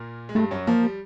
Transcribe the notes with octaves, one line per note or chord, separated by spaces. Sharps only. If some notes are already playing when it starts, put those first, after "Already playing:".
Already playing: A#2 A#3
G#3
G2 G3 A3
F#2 F#3
F3 A#3
G3